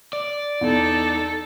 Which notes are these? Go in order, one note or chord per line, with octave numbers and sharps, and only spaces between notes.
D5
E2 D#4 A4